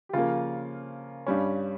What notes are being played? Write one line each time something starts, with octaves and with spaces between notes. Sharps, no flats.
G4
C#3 F3 A#3 F4
G2 G3 C#4